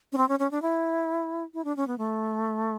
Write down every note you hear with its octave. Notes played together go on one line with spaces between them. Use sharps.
C#4
C4
C#4
C#4
D4
E4
E4
D4
C#4
B3
A3